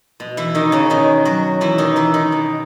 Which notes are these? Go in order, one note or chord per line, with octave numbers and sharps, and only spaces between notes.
B2
E3 E4
D#3 D#4
C#3 C#4
B2 D#3 D#4
F#3 F#4
B2 E3 E4
D#3 D#4
E3 E4
D#3 D#4
B2